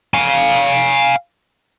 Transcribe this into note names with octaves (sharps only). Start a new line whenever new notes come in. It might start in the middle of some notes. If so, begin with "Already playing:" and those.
F5 G#5